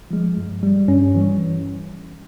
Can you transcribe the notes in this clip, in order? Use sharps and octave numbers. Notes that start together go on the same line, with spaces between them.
F3 G#3
G2
G3
G2 C#4
E3 G3